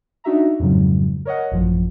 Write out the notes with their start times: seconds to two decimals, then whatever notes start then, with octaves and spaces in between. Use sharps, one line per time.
0.24 D4 D#4 F#4 E5 A#5
0.60 F2 G#2 C#3 F#3
1.25 A#4 C#5 D#5 F#5
1.52 A1 F#2 F3